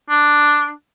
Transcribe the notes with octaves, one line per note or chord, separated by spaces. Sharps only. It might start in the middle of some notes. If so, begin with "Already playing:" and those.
D4